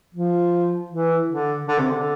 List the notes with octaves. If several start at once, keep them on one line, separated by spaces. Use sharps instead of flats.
F3
E3
D3
D3
C3
D3